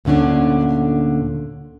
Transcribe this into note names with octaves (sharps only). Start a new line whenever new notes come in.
D2 A#2 D3 C#4 D4